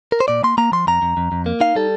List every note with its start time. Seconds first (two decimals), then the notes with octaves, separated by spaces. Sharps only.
0.12 A#4
0.20 C5
0.28 A#2 D5
0.43 A#3 C6
0.58 A#3 A#5
0.72 F3 C6
0.87 F2 A#5
1.02 F2
1.17 F2
1.32 F2
1.46 A#3
1.60 D#4 F5
1.75 G3 A4